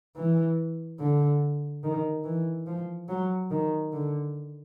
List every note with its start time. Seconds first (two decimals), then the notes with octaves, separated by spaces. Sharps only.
0.16 E3
0.99 D3
1.83 D#3
2.24 E3
2.67 F3
3.09 F#3
3.51 D#3
3.93 D3